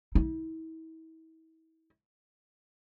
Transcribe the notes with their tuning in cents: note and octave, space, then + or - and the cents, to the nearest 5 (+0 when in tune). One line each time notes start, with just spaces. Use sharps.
E4 -40